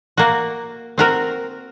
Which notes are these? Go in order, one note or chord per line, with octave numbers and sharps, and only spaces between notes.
A#3 F#4
C4 F#4 A#4